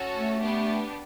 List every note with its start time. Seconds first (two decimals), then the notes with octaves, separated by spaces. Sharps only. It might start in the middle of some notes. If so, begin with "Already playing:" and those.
Already playing: C#4 F#4 A4
0.14 A3
0.41 B3 D4 G4